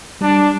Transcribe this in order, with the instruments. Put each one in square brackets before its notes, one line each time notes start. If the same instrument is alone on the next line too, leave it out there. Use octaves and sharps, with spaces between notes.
[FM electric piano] G3 [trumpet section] D4